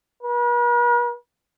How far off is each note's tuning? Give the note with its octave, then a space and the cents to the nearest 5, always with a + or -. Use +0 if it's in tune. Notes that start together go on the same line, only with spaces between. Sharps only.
B4 -45